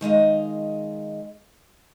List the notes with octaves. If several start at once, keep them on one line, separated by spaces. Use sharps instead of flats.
D#3 G#3 D#5 F5